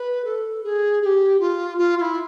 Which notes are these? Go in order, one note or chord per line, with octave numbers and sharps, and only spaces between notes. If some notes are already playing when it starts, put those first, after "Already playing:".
Already playing: B4
A4
G#4
G#4
G4
F4
F4
F4
E4